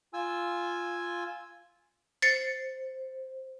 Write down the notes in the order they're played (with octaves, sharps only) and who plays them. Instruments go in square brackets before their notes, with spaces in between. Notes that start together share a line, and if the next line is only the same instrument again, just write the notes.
[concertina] F4 G#5 E6
[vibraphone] C5 [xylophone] A6 C7 C#7